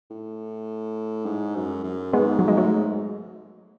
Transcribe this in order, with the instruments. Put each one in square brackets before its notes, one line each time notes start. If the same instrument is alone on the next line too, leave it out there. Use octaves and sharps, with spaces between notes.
[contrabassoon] A2
G#2
F#2
F#2
[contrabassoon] G#2 [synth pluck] G#3 B3
[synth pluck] F#3
G#3
F#3 A3